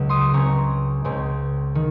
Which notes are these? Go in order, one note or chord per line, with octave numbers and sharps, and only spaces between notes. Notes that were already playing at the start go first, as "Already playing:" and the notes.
Already playing: C#2 C#3 F#3
C6 D#6
C#2 C#3 G#3 C4 A#5 C#6
C#2 C#3 G#3 C4
D#3